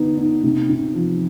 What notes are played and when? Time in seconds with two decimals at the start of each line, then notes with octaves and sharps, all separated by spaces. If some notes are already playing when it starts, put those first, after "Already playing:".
Already playing: D3 B3 D#4
0.18 D#4
0.43 C3
0.70 C3
0.95 F3